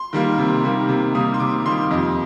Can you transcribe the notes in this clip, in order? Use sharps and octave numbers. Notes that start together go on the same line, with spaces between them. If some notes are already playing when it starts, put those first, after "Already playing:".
Already playing: C6
D#3 G3 A#3
C3
D#3 G3 A#3
C3
D#3 G3 A#3 D#6
C6
C3 D6
D#3 G3 A#3 C6
F2 D#5